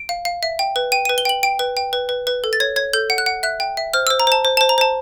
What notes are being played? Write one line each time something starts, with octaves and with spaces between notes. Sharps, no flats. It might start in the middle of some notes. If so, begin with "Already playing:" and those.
Already playing: D7
F5
F5
E5
G5
B4
G5 D#7
D#7
B4
G7
G5 F#7
G5 D7
B4
G5
B4
B4
B4
A4
A6
C#5 G#6
C#5 G#6
A4 G6
F#5
F#6
F#5
E5 F#6
G5
E5
C5 F6
E6
C5
A#5
C5 A5
C5
C5 A5
A#5
C5 A5